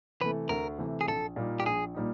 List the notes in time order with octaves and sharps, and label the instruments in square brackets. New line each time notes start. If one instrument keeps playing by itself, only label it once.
[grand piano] C3 E3 A3 [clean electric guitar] B4
[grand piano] D2 [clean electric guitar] A#4
[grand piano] C3 E3 A3
[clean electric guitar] G#4
[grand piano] A#1 [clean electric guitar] A4
[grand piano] A#2 G3 A#3 D#4
[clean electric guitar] G4
[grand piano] A#1 [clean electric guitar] G#4
[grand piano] A#2 G3 A#3 D#4